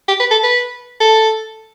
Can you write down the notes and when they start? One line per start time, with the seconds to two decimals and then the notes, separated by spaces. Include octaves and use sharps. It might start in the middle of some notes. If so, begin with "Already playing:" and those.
0.09 G4
0.20 B4
0.31 A4
0.43 B4
1.01 A4